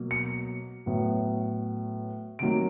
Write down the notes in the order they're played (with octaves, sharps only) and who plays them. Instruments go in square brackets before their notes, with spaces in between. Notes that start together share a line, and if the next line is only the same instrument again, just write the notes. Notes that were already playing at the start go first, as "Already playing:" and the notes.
Already playing: [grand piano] B2 F#3 A#3
C#7
A2 F#3 B3
C3 D#3 F#3 A#3 D7